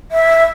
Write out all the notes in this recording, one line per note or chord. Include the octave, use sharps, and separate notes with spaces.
E5